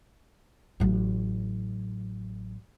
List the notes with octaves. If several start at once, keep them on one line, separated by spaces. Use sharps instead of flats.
A1 F#3